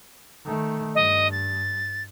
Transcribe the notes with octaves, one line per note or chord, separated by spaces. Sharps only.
D#3 A3
G2 D#5
A6